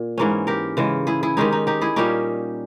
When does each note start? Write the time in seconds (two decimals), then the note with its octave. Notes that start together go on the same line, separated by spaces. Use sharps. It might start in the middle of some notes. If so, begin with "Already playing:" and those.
Already playing: A#2
0.18 G#2 E3 A#3 C#4
0.47 G4 A#4
0.77 C#3 E3 G#3
1.07 E4 G#4
1.23 E4 G#4
1.37 D#3 G#3 C#4 D#4 G4
1.52 D#4
1.67 D#4 G4
1.81 E4 G#4
1.96 A#2 G3 A#3 C#4 D#4 G4